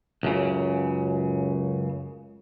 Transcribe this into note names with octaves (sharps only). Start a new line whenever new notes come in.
C#2 F#2 C#3